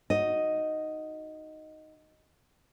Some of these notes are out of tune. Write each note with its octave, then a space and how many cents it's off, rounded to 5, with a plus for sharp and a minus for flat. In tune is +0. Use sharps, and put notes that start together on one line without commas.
D#4 +0 F#4 +0 D#5 +0